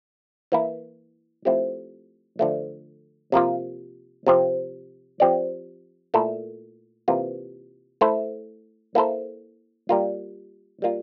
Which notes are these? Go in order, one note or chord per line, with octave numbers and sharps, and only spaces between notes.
E3 A#3 E4
F3 A3 C4 E4 G4
D3 F3 A3
C3 F3 A#3 F4
C3 F3 C4
F3 C4 G4 D5
A#2 A3 E4 A4
C3 E3 A#3 F4
A3 E4 A4 C5
A#3 E4 A4 C5
G3 A#3 F4
G3 A#3 F4